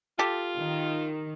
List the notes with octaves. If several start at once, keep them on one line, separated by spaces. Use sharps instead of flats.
F4 G4 A4
D#3